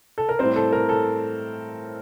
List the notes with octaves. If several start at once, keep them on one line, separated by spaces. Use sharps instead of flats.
A4
A#4
A2 G3 C4 C5
A4
A#4
A4